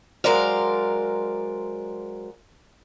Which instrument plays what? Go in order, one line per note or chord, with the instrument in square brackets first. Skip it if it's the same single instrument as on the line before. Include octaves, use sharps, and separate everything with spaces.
[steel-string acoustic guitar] F#3 G#3 A#4 C5 D5 F5